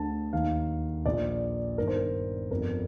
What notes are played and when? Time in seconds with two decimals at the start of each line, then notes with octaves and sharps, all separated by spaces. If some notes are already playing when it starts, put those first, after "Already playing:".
Already playing: D2 D3 A5
0.33 D#2 D#3 F5
1.06 A#1 A#2 D5
1.78 G1 G2 D#3 A#4
1.87 C5
1.96 A#4
2.51 G1 F2 D3 A#4